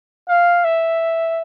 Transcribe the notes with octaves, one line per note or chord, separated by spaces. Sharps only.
F5
E5